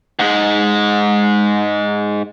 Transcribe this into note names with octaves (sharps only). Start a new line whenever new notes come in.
G#2 G#3